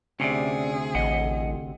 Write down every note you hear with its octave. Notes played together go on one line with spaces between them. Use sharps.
D2 C3 C#4 G#4 D5
A1 D#5 F#5